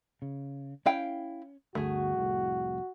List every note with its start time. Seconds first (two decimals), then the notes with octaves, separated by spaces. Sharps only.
0.22 C#3
0.86 C#4 E4 F5 G5
1.75 G1 D2 A3 F#4 G#4
2.17 C2 F2 A2